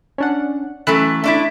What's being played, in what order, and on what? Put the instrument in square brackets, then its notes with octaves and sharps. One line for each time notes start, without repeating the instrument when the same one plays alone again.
[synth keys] C#4 D4 F#5
[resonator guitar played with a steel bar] E3 F#3 A3 [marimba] C#4 A4 B5 [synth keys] F#6
[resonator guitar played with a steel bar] A3 D4 E4